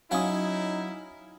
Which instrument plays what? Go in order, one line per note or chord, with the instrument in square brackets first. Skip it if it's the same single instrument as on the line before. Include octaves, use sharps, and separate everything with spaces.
[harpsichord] F#3 C#4 [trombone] D#4 [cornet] E4 [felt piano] F5 D#6